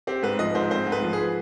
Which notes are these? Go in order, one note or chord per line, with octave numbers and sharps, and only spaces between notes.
C4 G4
G#2 B4
F3 D#5
G#2 C5
C4 C5
G#2
B4
F3
G#4